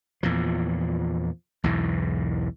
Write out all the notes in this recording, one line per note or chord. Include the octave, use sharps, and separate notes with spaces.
E2 A#2 F3
B1 E2 G#2 E3